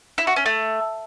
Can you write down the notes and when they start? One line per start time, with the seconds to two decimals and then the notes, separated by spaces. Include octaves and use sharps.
0.18 E4
0.27 F#4
0.36 C#4
0.46 A3